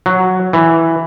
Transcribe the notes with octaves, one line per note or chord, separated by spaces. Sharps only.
F#3
E3